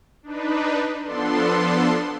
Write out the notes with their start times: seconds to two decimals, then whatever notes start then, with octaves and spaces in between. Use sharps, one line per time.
0.23 D4 D#4 B4
1.03 F3 B3 D4 A4 C6